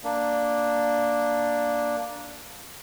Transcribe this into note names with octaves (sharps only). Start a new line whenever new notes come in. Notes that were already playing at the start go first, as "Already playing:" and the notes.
A#3 D4